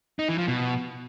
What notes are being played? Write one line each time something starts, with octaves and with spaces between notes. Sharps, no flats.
D#4
E3
F3
B2